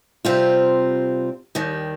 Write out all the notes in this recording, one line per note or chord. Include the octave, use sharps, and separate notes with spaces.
C3 G3 C4 F4
D#2 D#3 G3